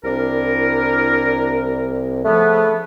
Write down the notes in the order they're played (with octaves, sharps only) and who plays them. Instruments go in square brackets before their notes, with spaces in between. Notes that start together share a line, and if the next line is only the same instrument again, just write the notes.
[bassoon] C2 [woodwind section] D4 E4 A#4
[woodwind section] C#3 F3 B3 [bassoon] A3